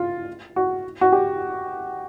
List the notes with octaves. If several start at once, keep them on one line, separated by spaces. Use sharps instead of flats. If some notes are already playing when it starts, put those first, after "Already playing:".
Already playing: F4
F#4
F#4
G4